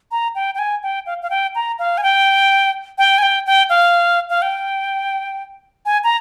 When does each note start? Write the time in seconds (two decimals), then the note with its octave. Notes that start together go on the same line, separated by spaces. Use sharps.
0.11 A#5
0.35 G5
0.55 G5
0.59 G#5
0.83 G5
1.06 F5
1.23 F5
1.30 G5
1.55 A#5
1.79 F5
1.98 G#5
2.03 G5
2.98 G5
3.18 G#5
3.22 G5
3.46 G5
3.70 F5
4.30 F5
4.42 G5
5.86 G#5
6.04 A#5